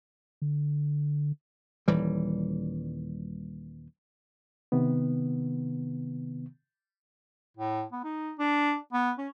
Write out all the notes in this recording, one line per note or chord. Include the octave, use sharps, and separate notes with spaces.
D3
D#1 E3 G3
C3 D#3 B3
A2
B3
D#4
D4
B3
C#4